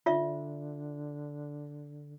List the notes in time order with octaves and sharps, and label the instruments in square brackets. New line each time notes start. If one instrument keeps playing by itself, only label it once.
[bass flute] D3 [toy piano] F4 D5 E5